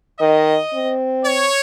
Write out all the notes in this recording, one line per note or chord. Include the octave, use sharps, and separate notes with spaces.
D#3 D#5
C4
C#5